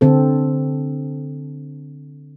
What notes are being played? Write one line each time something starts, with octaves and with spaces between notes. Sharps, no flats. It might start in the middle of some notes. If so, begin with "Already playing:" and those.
D3 C4 A4